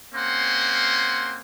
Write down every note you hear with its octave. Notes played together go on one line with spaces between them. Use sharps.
A#3 C4 C#4 F#5 G#5 C6